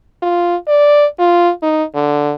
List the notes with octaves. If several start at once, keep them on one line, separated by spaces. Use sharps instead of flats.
F4
D5
F4
D#4
D3